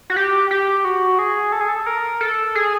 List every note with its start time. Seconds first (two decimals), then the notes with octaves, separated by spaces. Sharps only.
0.10 F#4
0.16 G4
0.51 G4
0.85 F#4
1.19 G#4
1.52 A4
1.61 G#4
1.68 A4
1.86 A#4
2.21 A4
2.55 G#4